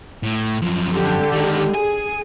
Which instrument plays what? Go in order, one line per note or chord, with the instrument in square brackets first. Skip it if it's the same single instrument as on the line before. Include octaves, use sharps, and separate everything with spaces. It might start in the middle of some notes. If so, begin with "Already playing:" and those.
[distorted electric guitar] A2
F#2 F3
[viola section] D3 G4
[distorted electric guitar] D#3 G#3
[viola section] G#4 [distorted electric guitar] G#5